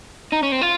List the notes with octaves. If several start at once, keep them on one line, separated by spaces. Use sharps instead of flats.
D#4
C#4
C4
F4